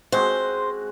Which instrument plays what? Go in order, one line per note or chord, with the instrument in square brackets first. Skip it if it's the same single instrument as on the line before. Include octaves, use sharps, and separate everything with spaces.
[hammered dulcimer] G#3 C4 F#4 [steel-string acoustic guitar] C5